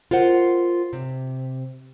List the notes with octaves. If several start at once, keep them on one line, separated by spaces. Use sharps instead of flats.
F4 A#4 C5 F#5
C3